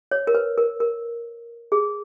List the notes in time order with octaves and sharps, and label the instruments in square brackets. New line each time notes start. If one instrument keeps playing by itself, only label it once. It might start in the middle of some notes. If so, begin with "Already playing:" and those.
[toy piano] C#5
A#4
B4
A#4
A#4
G#4